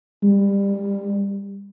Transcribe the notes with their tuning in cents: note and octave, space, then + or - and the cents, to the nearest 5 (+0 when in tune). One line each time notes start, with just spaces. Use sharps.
G3 +20